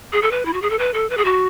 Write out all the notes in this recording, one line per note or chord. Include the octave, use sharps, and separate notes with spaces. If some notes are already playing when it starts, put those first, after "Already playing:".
G#4
A4
B4
E4
F#4
G#4
A4
B4
A4
B4
G#4
F#4